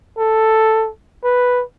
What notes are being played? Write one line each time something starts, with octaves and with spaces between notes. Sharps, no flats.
A4
B4